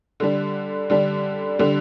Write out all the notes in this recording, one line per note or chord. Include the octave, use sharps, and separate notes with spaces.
D3 G3 D4
D3 G3 D4
D3 G3 D4